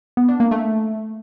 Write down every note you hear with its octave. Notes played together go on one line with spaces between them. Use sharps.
B3
D4
A#3
A3